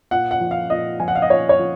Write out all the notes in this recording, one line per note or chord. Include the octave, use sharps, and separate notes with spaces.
A#2 F#5
F#5
F3
F5
A#2 D#5
F3 G#5
F#5
F5
D#5
A#2 C#5
C#5
F3